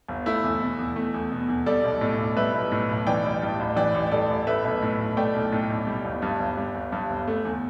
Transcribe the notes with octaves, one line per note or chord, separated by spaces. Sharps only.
G1
A3 E4 A4
E2
B2
E2
A3
E2
B2
E2
G3 A4 D5
B1
A2
B1
G3 B4 E5
B1
A2
B1
E3 D5 G5
A1
G2
A1
E3 D5 G5
A1
G2 A4 D5
A1
A3 B4 E5
B1
A2
B1
A3 D5 G5
B1
A2
B1
G3
G1
G2
G1
G3
G1
G2
G1
A3
E2